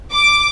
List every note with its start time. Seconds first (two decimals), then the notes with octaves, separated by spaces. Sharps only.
0.13 D6